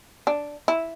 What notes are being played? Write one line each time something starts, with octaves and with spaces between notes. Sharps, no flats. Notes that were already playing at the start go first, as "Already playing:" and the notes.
D4
E4